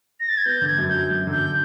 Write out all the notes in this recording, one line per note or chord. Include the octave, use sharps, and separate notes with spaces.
A#6
A6
G#6
B3 G6
D3
G#6
F#2
G6
F#3
F#2
D3
G6